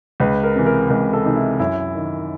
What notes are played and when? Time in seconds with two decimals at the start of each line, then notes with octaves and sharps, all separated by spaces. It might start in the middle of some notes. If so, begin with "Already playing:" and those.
0.20 C#2 B4
0.44 A#4
0.56 C3 E3
0.66 A#4
0.89 C#2 A#4
1.13 A4
1.25 C3 E3 D#4
1.36 E4
1.59 F#2 E4
1.95 D#3